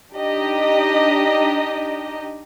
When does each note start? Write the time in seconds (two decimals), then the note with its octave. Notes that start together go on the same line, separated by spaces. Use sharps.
0.13 D4 D#4 G4 D#5